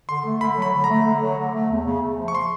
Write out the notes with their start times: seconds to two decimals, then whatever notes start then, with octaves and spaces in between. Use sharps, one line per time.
0.09 D3 C6
0.25 A3
0.41 D3 B5
0.57 F#3 B5
0.74 D3
0.84 A#5
0.90 A3
1.05 D3
1.22 F#3
1.38 D3
1.54 A3
1.70 E2
1.86 C#3
2.02 A3
2.18 F3
2.28 C#6
2.35 C6